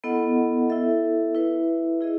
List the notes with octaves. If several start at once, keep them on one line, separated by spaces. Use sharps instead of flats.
B3 E4 A4 D#5 F#5
E4 A4 E5
E4 B4 E5
E4 G#4 D#5